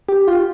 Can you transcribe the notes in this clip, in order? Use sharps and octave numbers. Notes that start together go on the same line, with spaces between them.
G4
F4